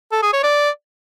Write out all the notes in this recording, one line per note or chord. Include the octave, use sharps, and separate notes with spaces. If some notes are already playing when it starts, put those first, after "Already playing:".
A4
G#4
C#5
D5